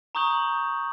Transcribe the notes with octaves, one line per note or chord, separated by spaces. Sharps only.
A#5 C#6 D#6 G6 F#7